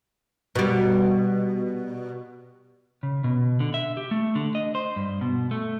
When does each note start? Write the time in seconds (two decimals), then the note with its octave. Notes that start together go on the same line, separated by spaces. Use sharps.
0.55 B2 G3
3.03 C#3
3.24 B2
3.60 D3
3.74 E5
3.97 G4
4.11 A3
4.35 D3
4.55 D#5
4.75 C5
4.96 G2
5.21 B2
5.51 A3